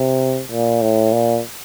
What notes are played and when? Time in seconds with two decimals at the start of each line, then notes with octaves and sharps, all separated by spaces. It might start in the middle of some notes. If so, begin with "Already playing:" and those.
Already playing: C3
0.52 A#2
0.82 A2
1.13 A#2